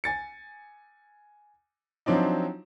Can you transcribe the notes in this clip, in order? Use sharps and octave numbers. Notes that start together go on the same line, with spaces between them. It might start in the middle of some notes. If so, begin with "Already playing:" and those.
G#5 A6 C#7
F3 F#3 C4 D4 D#4